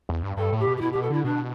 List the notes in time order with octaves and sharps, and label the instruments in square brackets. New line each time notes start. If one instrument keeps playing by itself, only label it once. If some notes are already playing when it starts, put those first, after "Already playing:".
[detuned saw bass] E2
G2
[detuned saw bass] G2 [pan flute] A4
[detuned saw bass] A2
[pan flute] G4
[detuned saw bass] B2
[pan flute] G4
[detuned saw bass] B2 [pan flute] E4
[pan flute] G4
[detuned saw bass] B2
[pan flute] A4
[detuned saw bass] D3 [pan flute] E4
[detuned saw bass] B2 [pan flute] D4